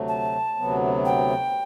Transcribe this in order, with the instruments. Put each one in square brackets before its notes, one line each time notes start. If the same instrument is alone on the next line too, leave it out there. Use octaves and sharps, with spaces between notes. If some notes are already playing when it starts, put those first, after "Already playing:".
Already playing: [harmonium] D2 C3 F#3 A3
[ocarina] A5
[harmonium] D2 C3 F#3 B3
[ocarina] G5